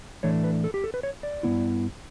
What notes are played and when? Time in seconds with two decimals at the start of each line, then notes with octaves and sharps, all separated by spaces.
0.23 A2 E3 A3 D4 C#5
0.44 B4
0.64 A4
0.74 G4
0.84 A4
0.94 B4
1.03 C#5
1.23 D5
1.43 G2 E3 B3 E4